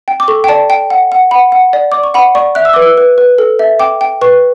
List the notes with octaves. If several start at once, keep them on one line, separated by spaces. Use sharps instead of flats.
G5
D6
A4 C#6
G5
D5 A5
G5
F#5
F#5
F#5 B5
F#5
D5
D5 D6
C#6
F#5 B5
D5 C#6
E5 F#6
E6
B4 D6
E6
B4
B4
A4
E5
G5 D6
G5
B4 C#6